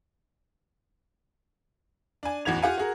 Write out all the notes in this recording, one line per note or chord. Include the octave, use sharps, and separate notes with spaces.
D4 G#5
A1 E2 F#4 G#6 F7
F4 G4 F#5 G#5
F#4 G#4 A#4